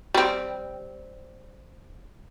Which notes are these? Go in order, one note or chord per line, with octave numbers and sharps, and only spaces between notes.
G3 C4